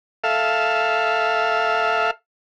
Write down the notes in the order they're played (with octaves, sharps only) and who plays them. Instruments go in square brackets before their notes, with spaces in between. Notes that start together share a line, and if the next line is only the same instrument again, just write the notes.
[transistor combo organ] A4 E5 F5